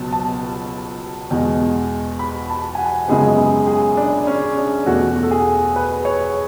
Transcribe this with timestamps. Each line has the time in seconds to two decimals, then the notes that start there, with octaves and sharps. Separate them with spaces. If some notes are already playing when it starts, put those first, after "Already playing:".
Already playing: C#2 B2 F#3 B3 A5
0.12 A5
1.31 E2 B2 G#3
2.19 B5
2.50 A5
2.75 G#5
2.78 F#5
3.08 F#2 C#3 G#3 B3 G#4
3.38 G#4
3.67 G#4
3.97 D4
4.27 C#4
4.57 D4
4.86 E2 B2 A3 F#4
5.23 A4
5.31 G#4
5.76 B4
6.05 C#5